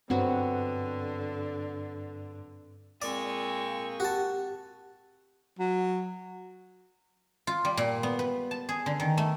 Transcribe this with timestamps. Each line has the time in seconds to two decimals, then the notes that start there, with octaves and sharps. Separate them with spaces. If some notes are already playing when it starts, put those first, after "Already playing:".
0.10 G2 D3 F#3 B3 C4 F#4
3.02 A#2 G#3 C4 D5 C#6
4.00 F#4 G4 A5
5.59 F#3
7.47 F4
7.65 G3
7.77 A#2
8.03 B3
8.19 B4
8.51 A5
8.69 G#4
8.86 D3
9.00 D#3
9.17 A3